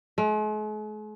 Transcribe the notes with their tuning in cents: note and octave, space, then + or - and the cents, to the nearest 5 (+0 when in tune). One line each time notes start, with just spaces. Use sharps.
G#3 +45